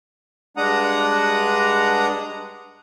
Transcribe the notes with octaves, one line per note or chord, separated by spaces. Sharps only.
G2 G#3 D4 F#5 A#5 D#6